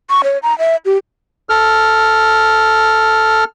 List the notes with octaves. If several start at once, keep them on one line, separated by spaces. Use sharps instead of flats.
C#6
C#5
A#5
E5
G4
A4 F6